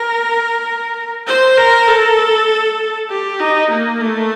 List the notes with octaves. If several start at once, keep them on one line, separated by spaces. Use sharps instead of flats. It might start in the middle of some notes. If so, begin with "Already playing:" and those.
Already playing: A#4
C5
A#4
A4
G4
D#4
A#3
A3